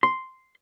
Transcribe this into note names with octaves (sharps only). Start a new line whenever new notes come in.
C6